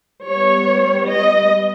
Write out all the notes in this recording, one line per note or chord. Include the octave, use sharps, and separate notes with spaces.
G3 B3 C#5
D#5